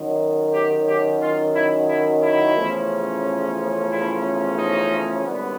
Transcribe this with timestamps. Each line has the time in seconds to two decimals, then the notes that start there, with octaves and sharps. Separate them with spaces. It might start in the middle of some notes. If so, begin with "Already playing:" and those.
Already playing: F#2 D#3 F#3
0.53 G4
0.87 G4
1.20 F4
1.53 E4
1.88 E4
2.22 E4
2.55 E2 C#3 F3 A3 C#4
3.91 E4
4.57 D#4
5.25 G#1 F#2 D3 G3 B3